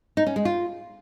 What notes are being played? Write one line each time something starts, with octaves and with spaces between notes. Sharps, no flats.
D#4
C#4
G#3
F4